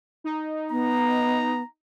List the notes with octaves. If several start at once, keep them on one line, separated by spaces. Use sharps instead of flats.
D#4
B3 A#5